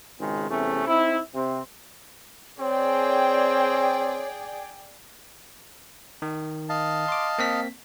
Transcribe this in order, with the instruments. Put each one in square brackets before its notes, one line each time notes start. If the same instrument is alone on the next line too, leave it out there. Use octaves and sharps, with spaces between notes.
[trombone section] G#1 C#2 D#3 G#3
E2 C3 A3 C#4
C4 D#4 E4
C3 C4
[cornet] C4 [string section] G#4 D5 G5 [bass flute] C#5
[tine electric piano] D#3
[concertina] D#5 F5 A5
[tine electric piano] C6 D6
A#3 C4 B6